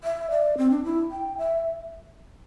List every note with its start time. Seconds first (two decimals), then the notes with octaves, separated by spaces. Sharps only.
0.04 E5
0.31 D5
0.58 C4
0.70 D4
0.85 E4
1.11 G5
1.38 E5